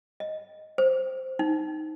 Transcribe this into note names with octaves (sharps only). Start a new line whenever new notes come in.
D#5
C5
D#4